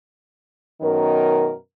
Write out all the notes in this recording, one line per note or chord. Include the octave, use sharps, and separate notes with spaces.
F#2 B2 D#3 A#4